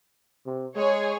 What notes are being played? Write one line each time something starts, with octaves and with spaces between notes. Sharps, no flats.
C3
G#3 G#4 C#5